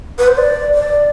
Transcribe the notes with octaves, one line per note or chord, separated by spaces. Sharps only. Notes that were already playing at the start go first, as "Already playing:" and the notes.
B4
C5
D5
D5